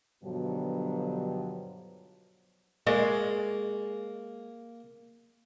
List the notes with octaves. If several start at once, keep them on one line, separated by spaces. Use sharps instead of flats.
G2 B2 D3 F3 F#3
G#3 A#3